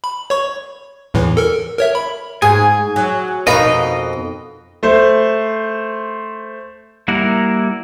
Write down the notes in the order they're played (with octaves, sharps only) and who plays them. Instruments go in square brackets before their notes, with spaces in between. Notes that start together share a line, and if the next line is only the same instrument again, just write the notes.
[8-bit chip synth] B5
C#5 C#6
E2 A2 E3
A4 A#4
A#4 C#5 E5
B5
[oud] G#2 [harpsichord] G#4 [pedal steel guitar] G#5
[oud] F#3
[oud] F2 B2 D#4 [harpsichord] A#4 F5 B5 [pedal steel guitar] D#5
[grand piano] A3 C5
[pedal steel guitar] G3 A#3 E4 A#4 F#5